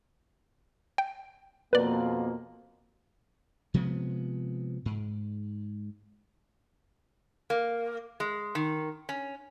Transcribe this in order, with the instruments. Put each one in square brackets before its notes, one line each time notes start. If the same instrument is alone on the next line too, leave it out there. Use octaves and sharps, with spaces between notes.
[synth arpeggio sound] G5
[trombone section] F2 B2 A#3 [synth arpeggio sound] B4 D5
[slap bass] C3 F3 G#3 B3
G#2
[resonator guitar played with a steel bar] A#3
G#3
D#3
C#4